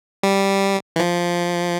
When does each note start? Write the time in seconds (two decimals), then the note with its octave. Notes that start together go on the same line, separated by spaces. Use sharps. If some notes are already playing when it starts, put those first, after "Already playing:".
0.23 G3
0.96 E3
1.00 F3